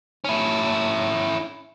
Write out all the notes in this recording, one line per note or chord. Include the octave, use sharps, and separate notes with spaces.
C#4 E4